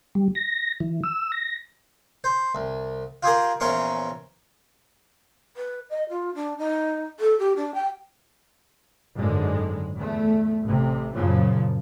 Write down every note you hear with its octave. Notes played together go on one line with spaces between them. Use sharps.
G3
A#6
E3
E6
A#6
C5
C2
F4 G4 G#4 A#4
A#1 E2 C#4 A#4 C6 C#6
B4
D#5
F4
D4
D#4
A4
G4
D4
G5
G#1 F#2 D3 G#3
E2 A3
A1 C3
F#2 A#2 C#3 F3